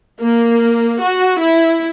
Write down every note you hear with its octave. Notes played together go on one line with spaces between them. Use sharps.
A#3
F#4
E4